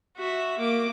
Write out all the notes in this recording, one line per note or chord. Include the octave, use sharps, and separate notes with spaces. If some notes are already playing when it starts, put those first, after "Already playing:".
F#4 E5
A#3 D6